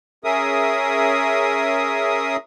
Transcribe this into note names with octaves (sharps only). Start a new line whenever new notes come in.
C#4 G#4 A#4 E5 D#6